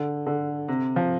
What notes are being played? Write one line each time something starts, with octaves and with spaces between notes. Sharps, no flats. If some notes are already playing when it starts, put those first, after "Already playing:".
Already playing: D3
D3
C3
F3